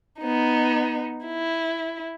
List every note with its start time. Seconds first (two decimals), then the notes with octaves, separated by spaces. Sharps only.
0.21 B3 D#4
1.26 E4